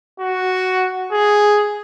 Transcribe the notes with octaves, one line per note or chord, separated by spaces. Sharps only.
F#4
G#4